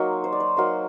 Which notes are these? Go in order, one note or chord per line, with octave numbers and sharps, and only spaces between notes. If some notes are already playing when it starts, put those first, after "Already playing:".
Already playing: F#3 A#3 D#4 C6
C5
D5
C5
F#3 A#3 D#4 C5